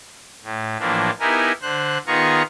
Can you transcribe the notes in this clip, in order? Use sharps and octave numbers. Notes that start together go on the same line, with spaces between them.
A2
A2 E3 F3 A#3 D4
B3 D#4 E4 G4 A#4 G#5
D3 C5 F#6
D#3 B3 F4 G#4 A#5 C#6